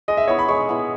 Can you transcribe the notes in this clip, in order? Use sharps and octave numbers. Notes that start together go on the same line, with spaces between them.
G#3 D#5
E5
B3 E4 C#5
B5
G#3 C#6
B3 E4